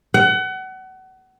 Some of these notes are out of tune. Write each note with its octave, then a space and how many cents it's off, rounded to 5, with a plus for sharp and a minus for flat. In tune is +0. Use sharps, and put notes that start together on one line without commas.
F#5 +30